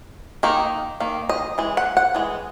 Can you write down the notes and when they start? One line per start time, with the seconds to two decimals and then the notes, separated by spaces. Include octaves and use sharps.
0.43 D#3 A#3 D#4
1.00 D#3 A#3
1.29 D#5
1.58 E3 G#3
1.77 F#5
1.97 F#5
2.15 E3 G#3